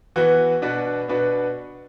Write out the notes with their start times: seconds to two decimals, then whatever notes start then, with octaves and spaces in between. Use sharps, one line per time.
0.16 E3 B3 F#4 B4
0.62 B2 B3 D4 F#4 B4
1.08 B2 B3 D4 F#4 B4